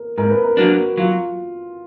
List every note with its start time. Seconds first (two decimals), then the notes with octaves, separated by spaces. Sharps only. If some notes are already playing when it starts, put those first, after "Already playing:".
Already playing: A#4
0.18 G#2 A#4
0.30 B4
0.44 A#4
0.57 F#3 A#3 D4 F#4
0.97 F#3 F4